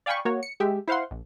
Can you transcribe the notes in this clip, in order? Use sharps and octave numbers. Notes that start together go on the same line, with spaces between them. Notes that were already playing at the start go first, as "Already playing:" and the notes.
D5 F5 G5 G#5 B5 C#6
A#3 F#4 C#5
C#7
G#3 G4 E5
E4 C5 F5 F#5 C6
A#1